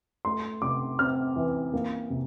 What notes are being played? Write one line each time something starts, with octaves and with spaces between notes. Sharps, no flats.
A3 C6
C3 D6
C4 F6
E3
A#3
C3